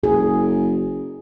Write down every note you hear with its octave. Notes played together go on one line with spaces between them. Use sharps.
F#1 G#4